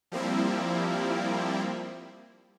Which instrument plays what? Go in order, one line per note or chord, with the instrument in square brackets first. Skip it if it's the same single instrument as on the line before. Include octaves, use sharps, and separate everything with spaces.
[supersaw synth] F3 G3 A#3 C4 E4